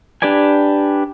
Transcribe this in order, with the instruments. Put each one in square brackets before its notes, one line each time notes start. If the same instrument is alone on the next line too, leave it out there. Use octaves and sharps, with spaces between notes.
[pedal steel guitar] D4 G4 B4 D5 G#5